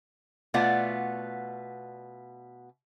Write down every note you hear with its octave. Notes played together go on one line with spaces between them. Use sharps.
B2 A3 B3 F4 D5 F#5